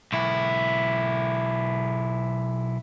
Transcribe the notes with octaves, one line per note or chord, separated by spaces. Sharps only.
B1 E4